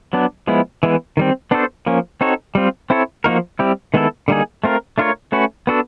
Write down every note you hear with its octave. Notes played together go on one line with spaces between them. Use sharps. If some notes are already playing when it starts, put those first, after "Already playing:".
F#3 B3 D4
F3 G#3 B3 E4
E3 G#3 B3 E4
D#3 G3 C4
B3 D4 F#4 A4 C5
F3 A#3 C#4
C4 D#4 F#4 A4 C#5
G3 C4 F4
C4 E4 A4 C#5
F3 A#3 D#4 F#4 A#4
G3 C4 E4 G4
D#3 G#3 B3 E4 A4
D3 G3 A#3 D#4 G#4
A3 C4 F4 A#4
A3 D4 F4 A#4 C#5
A3 C#4 F#4 B4
B3 D4 F#4 A4